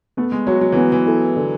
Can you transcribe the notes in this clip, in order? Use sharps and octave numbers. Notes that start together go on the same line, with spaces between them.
A3 B3
G#3
F#3 F#4 C#5
F#3
E3 B3
E3
E4 A4
D3